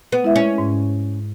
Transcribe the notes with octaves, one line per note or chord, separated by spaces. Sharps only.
B3
G#3 E4 B4 E5
C#4
G#2